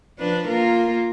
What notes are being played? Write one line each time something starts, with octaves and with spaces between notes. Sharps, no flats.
F3 D4 B4
A#3 F4 A#4